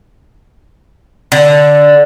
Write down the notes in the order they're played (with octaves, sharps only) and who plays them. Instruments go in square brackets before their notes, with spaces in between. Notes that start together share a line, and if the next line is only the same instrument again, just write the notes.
[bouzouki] D3